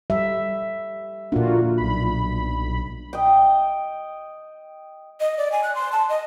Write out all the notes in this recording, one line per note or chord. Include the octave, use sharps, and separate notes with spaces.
G3 E5
A#2 A#3 D4 F4 F#4
B1 B5
D#5 G5
D#5
D5
G#5
F#6
C6
A5
D#5